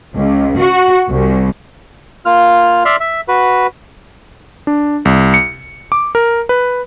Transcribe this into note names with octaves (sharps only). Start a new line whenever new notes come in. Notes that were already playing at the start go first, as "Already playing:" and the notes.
C#2
F#4
C2
A#3 F4 F6
D5 E5 C6 F6
E5
F#4 B4
D4
C2
C#7
D6
A#4
B4